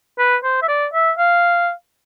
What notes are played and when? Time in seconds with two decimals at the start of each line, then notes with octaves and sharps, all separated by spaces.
0.19 B4
0.44 C5
0.62 E5
0.68 D5
0.93 E5
1.18 F5